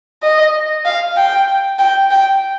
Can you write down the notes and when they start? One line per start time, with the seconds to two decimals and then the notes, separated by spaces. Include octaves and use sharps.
0.23 D#5
0.85 F5
1.17 G5
1.79 G5
2.11 G5